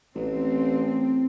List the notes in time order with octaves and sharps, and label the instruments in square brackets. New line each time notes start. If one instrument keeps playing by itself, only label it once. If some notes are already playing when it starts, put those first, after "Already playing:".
[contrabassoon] A1 [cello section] C4